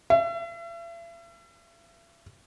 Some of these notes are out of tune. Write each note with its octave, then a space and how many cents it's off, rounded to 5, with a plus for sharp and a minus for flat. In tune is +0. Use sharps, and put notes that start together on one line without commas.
E5 +40